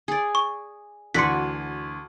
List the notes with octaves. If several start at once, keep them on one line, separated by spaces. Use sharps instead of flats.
G#4 D5
C#6
D2 E3 F#4 D5 C6 B6 C#7